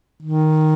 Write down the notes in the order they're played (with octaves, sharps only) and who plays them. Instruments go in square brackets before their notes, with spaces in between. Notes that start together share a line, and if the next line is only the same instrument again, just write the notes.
[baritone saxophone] D#3